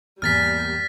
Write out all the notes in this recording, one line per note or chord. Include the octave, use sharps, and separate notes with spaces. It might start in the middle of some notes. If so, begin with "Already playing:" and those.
E2 G#2 G3 A#3 G#4 F6 A6 B6